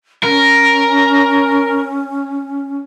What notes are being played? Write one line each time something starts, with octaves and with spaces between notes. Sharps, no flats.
C#4 A#4